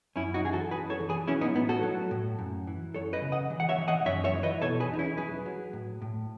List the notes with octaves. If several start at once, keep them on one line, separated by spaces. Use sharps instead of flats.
F#2 C#4 E4
D#4 F#4
E3 G#4
F#4 A4
F#2 G#4 B4
A4 C#5
E3
G#4 B4
F#3 C#4 E4
B3 D#4
A2 B3
F#4 A4
F#3
A2
F#2
E3
F#2 A4 C#5
B4 D#5
C#3
D#5 F#5
E3
F#5
C#5 E5
E3
D#5 F#5
F#2 C#5 E5
C#5 E5
E3
B4 D#5
B2 A4 C#5
G#4 B4
E2 D#4
C#4 E4
F#3 G#4 B4
F#3
A2
A2